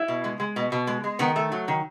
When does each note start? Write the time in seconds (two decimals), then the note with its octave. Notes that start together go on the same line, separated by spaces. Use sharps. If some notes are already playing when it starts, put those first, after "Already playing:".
Already playing: E4
0.08 B2
0.24 G#3
0.40 G#3
0.56 B2
0.72 B2
0.87 G#3
1.04 G#3
1.19 D#3 B3
1.36 A3
1.52 F#3
1.68 D#3